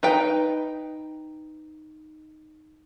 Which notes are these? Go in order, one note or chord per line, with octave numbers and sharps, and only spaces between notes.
D#4 B4 G5